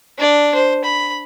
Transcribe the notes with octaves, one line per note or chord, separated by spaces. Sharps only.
D4 D5
C5
B5